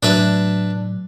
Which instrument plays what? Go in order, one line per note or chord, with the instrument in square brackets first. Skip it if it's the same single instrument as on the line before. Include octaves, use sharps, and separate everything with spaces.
[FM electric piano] A2 F#3 [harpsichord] D4 B4 E5